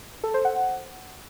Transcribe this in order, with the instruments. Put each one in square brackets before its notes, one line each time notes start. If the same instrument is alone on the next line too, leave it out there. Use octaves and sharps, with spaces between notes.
[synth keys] A4
C5
F#5